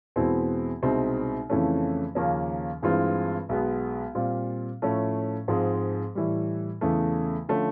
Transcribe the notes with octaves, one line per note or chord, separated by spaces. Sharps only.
E2 B2 G#3 C4 E4
C2 B2 G#3 C4 D#4
F2 C#3 E3 A3 C#4
D#2 C#3 F3 A#3 C#4
G2 E3 G#3 C4 F4
B1 B2 G#3 B3
A#2 G3 C4 F4
A2 F3 A3 C#4
G#2 F3 G#3 C4
A2 E3 G3
E2 C#3 E3 A3
D3 F3 A3 C#4